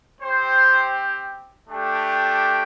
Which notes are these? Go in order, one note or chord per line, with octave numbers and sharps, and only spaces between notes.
C4 G4 C5
A3 D4 G4